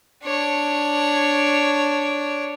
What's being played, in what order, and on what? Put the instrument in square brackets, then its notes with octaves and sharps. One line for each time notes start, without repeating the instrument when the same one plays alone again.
[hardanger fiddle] D4 C#5